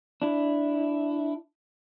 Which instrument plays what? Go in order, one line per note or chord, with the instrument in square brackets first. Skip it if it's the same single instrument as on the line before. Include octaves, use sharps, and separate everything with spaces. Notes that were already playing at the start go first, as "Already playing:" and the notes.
[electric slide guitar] D4 E4